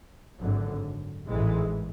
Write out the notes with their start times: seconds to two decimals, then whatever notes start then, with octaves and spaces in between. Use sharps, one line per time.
0.40 G#1 F#2 D3
1.27 A1 G#2 E3 G#3